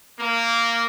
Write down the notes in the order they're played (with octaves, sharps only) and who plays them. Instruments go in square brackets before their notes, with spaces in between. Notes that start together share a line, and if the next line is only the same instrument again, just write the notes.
[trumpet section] A#3